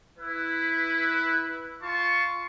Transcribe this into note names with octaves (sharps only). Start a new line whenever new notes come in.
E4 B4
F4 A5 C6 C#6